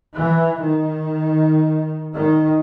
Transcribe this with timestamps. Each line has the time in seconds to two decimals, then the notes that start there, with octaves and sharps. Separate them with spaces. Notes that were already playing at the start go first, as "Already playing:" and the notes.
0.16 E3
0.61 D#3
2.15 D#3